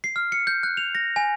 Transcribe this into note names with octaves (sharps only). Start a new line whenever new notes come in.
C7
F6
C#7
G6
F#6
F7
A#6
G#5